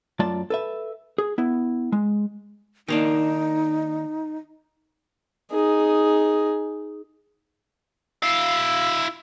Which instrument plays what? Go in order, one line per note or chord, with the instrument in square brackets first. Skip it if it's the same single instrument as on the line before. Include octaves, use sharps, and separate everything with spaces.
[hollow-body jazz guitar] F#2 A3 F4 D5 A5
A4 B4 E5
G#4
B3 E4
G#3
[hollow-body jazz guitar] D#3 A#3 D4 [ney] D#4
[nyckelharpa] D#4 G#4
[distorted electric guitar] E4 F5 [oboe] E6